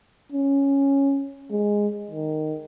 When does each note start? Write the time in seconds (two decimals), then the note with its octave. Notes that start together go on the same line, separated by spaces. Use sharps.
0.32 C#4
1.51 G#3
2.11 D#3